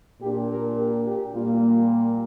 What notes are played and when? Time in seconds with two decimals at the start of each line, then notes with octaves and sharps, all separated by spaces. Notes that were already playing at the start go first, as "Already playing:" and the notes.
0.21 A#2 A#3 D4 G4
0.50 A#4
0.77 G4
1.06 G4
1.33 A#2 G3 A#3 F4